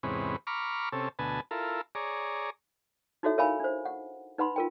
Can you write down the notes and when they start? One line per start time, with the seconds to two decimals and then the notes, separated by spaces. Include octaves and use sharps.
0.03 E2 G#2 C3 C#4 B4
0.47 A#5 B5 C#6 D6 F6
0.92 C3 C#4 A4
1.19 D2 B2 B4 G#5 A5
1.51 E4 F4 A4 A#4
1.95 G#4 C#5 D5 A#5
3.23 D#4 E4 F#4 A4 C#5 E5
3.38 A#4 C#5 E5 F5 G#5 B5
3.60 D4 C5
3.85 F#5
4.38 D#4 B4 F#5 B5 C6
4.56 F4 A#4 G5